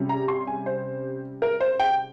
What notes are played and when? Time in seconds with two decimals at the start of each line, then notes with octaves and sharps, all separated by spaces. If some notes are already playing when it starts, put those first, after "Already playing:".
Already playing: C3 G3 C#4
0.09 A#5
0.28 C6
0.47 G#5
0.66 C5
1.42 A#4
1.60 C5
1.80 G5